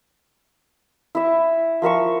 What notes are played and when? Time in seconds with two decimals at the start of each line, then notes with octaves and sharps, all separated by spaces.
1.15 E4 E5
1.82 F3 A#4 E5 C#6